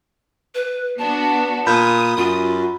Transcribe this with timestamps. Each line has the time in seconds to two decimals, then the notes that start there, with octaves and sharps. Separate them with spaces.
0.54 B4
0.98 B3 D4 F#4 A5
1.67 A#2 B5 D#6 G6
2.17 F#2 F4